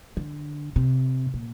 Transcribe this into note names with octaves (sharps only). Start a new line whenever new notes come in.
D3
C3
A#2